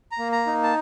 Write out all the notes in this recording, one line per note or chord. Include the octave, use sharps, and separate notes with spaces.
A#5
A#3
A#5
D#4
A5